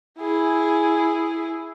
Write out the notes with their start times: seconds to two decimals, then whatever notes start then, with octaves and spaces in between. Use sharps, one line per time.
0.18 E4 G#4